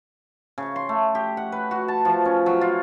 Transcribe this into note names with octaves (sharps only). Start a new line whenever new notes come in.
C#3
C6
A3
G4
F#5
B4
F#4
A5
F3
C#4
F#3
F4